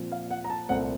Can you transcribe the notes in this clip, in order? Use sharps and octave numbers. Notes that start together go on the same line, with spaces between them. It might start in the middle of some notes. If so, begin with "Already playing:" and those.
Already playing: A#2 F3 C4
F5
F#5
A#5
A5
C2 A#2 A3 C4 F#5